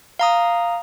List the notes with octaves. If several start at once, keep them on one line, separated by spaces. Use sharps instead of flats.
F5 A#5 D#6